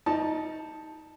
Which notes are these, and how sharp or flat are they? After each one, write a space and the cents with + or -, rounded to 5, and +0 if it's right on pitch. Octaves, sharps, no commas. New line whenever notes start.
D#4 +20 D5 +40 A5 +0